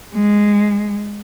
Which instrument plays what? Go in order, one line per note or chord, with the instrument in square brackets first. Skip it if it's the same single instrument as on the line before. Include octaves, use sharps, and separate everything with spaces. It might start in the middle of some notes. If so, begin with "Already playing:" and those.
[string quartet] G#3